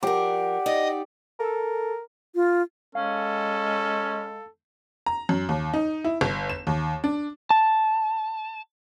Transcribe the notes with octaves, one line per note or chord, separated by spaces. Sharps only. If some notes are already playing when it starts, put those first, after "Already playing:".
F3 G4 A#4 D5 F#5
D#4 D5 D#5
A4 A#4
F4
G#3 C#4 A4 F5
A#5
F#2
D#2
D#4
E4
G1
E7
D#2
D4
A5